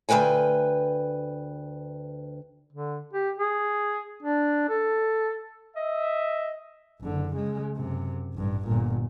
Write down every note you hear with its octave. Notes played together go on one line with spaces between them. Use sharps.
D2 G#3 B4 G5 G#5
D3
G4
G#4
D4
A4
D#5 E5
F#1 D3
C#3 G#3
F#2 C3
A1 G2
G1 A#2